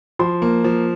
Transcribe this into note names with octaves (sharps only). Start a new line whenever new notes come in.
F3 C6
A#3
F3